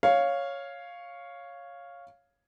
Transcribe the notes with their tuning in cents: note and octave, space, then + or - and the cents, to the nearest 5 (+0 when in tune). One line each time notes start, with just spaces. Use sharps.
C#5 +0 F5 +0